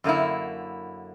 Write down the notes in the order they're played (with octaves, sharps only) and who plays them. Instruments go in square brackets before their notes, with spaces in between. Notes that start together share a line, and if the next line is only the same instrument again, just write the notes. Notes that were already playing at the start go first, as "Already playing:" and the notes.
[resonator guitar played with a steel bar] F#2 D3 A#3 E4